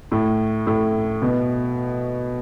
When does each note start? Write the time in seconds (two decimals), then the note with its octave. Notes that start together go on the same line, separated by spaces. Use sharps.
0.12 A2
0.67 A2
1.22 B2